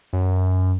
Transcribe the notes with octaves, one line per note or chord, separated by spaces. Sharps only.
F#2